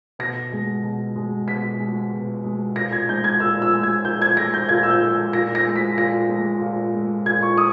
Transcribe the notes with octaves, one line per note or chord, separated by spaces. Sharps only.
B2 A#6
G#3
B2
G#3
B2 B6
G#3
B2
G#3
A#2 A#6
G#6
G#3 G6
G#6
A#2 E6
E6
G#3
G#6
A#2 G6
G#6
G#3 A#6
G6
A#2 G#6
E6
G6
G#3
A#2 A#6
A#6
G#3
B6
A#2 A#6
G#3
A#2
G#3
A#2 G#6
C#6
D#6